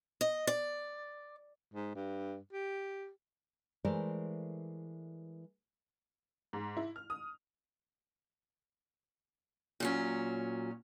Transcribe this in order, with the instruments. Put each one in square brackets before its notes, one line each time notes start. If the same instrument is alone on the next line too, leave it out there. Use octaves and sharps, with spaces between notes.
[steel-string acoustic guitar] D#5
D5
[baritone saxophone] G#2
G2
G4
[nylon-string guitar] E3 G#3 A3 A#4 C5 D5
[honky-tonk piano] G#2
E4
F6
D#6
[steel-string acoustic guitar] A#2 F#3 C#4